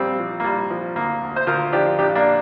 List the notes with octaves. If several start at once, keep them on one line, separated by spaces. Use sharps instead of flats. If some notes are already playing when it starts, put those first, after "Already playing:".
Already playing: A#1 G3 C4
F3
A#3
A#1 G3
F3
D2 A#3
D2
C5
D2 F4 A#4
F3 D4 G4
A#1 D4 G4
A#3 D4